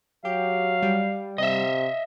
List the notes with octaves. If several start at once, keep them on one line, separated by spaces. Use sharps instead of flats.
F#3 G4 F5
G3
C3 D#5 E5